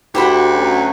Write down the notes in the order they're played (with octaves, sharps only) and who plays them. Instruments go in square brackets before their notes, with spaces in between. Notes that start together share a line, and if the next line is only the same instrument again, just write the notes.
[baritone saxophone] D2 [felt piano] F#4 [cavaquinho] G4 C5 B5
[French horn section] F#3 A3 C#4